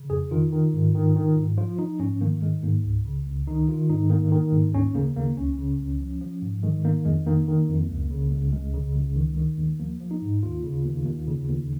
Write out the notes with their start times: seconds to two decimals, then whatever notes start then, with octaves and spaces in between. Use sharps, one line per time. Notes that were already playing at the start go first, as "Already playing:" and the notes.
Already playing: C#3
0.10 F2 G#4
0.31 D#3 F4
0.52 D#3
0.73 G#2
0.94 D#3
1.16 D#3
1.36 G#2
1.57 F3 F4
1.79 F3 D#4
2.00 G#2 C#4
2.21 D#3 A#3
2.42 D#3 G#3
2.63 G#2 A#3
2.84 C#2
3.05 C#3
3.27 C#2
3.47 D#3 D#4
3.68 D#3 F4
3.90 G#2 D#4
4.10 D#3 A#3
4.32 D#3
4.52 G#2
4.74 D#2 C#4
4.95 C#3 A#3
5.16 D#2 A#3
5.37 C#2 C#4
5.59 C#3
5.79 C#2
6.00 F3
6.21 F3
6.43 G#2
6.63 D#3 G#3
6.85 D#3 A#3
7.05 F2 G#3
7.27 D#3 A#3
7.48 D#3
7.69 F2
7.90 C#2
8.11 C#3
8.32 C#2
8.52 C#2 G#3
8.74 C#3
8.95 C#2
9.16 D#3
9.37 D#3
9.58 D#2
9.80 F3 A#3
10.00 F3
10.11 D#4
10.22 G#2
10.43 D#2 F4
10.64 C#3
10.85 D#2
11.06 D#2
11.27 C#3
11.48 D#2